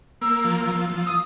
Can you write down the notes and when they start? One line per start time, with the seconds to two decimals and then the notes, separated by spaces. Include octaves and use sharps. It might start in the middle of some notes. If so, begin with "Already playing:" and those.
0.22 A#3 E6
0.44 F3 E6
0.67 F3 E6
0.90 F3
1.06 D#6